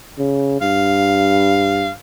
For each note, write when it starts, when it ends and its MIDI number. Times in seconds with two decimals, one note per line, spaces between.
0.19 0.56 49
0.61 1.91 43
0.61 1.91 77